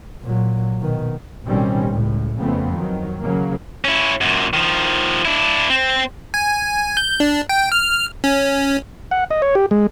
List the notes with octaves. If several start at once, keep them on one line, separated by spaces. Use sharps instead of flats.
A#2 F#3
B2 D#3
A1 B2 D#3 G3 C4 C#4
C#2 A2
F2 C#3 A3 B3 C4
D#3 F#3
C#3 F#3 A#3
C#4 E4
F#2 A#2
D#3 F3
D4 E4
C4
G#5
G6
D4
G5
F6
C#4
F#5
D#5
C#5
G4
G#3